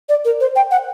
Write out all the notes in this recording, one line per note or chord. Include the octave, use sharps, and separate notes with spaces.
D5
A#4
C5
G5
F#5